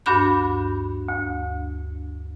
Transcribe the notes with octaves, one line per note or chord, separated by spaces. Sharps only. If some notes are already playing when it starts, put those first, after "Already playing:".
D2 G2 D4 F#4 B5 G6
D2